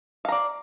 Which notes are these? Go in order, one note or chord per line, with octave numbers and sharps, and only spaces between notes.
D5 F5 A#5